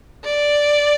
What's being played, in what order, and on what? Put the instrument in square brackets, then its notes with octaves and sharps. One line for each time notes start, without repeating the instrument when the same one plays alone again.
[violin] D5